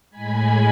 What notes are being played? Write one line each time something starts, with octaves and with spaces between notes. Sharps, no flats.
A2 G#3 G#5 B5